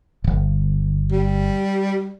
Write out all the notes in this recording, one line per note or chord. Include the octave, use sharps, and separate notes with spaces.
D1 G1
G3